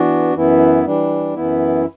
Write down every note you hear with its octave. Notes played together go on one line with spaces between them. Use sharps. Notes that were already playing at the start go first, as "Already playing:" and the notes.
Already playing: E3 B3 D4 F#4
F#2 E3 B3 E4
E3 G3 D4
F#2 E3 B3 E4